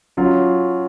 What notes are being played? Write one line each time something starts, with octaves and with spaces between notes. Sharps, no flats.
F#3 C#4 F4